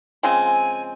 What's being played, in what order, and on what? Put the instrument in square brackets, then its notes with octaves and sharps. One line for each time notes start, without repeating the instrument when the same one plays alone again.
[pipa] C#3 F3 G#3 C4 [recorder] G#5